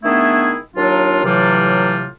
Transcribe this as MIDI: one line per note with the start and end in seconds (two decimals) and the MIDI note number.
0.04 0.55 51
0.04 0.55 57
0.04 0.55 59
0.04 0.55 62
0.04 0.55 64
0.04 0.55 68
0.76 1.22 39
0.76 1.22 54
0.76 1.22 62
0.76 1.22 65
1.24 2.07 45
1.24 2.07 48
1.24 2.07 52
1.24 2.07 54
1.24 2.07 55
1.24 2.07 65